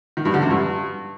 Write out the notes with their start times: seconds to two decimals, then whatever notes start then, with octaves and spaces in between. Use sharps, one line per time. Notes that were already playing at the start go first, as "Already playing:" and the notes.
0.17 D#3
0.25 G2
0.34 D3
0.42 F#2
0.51 G2